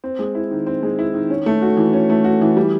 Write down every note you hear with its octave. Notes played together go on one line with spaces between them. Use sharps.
C4
G#3
E4
D#3
C4
G#3
E4
D#3
C#4
A3
F#4
E3
C#4
A3
F#4
E3
G3